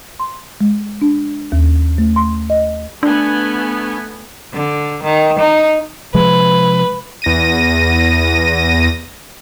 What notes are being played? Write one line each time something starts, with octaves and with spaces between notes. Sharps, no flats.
C6
G#3
D4
D#2
A3
C6
D#5
A3 B3 D4 G#5
D3
D#3
D#4
C3 F3 G#3 B4
E2 A#6 D#7